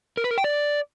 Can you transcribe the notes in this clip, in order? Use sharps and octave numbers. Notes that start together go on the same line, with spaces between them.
A#4
B4
A#4
G5
D5